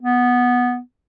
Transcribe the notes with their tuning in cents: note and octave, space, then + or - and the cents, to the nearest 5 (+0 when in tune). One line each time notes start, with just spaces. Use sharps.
B3 -5